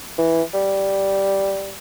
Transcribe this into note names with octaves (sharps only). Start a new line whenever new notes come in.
E3
G3